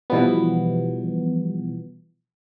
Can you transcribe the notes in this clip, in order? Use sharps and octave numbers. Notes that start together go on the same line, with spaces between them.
B2 E3 F3 G3 B3